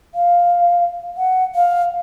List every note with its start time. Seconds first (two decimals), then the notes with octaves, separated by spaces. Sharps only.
0.15 F5
1.17 F#5
1.55 F5